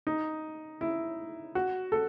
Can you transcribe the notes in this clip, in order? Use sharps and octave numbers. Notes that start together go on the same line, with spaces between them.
D#4
E4
F#4
A4